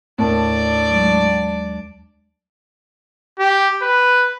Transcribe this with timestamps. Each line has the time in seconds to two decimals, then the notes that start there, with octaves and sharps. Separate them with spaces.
0.19 D#2 A2 D4 A#4 D5 A5
0.89 F#3 G#3
3.39 G4
3.82 B4